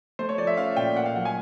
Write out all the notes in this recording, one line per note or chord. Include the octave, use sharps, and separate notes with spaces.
A3 C5
C#5
F3 D5
E5
C#4 F5
A#2 G5
A#3 F#5
F5
F#3 F#5
G#5